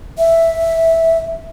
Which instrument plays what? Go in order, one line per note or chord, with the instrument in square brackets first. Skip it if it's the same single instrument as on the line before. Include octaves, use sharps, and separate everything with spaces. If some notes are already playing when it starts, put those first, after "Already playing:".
[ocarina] E5